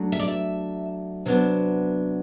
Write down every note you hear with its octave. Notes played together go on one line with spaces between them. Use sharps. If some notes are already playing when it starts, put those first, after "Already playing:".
Already playing: F#3 A3 D4
E5
D5
E5
C3 F#3 B3 D4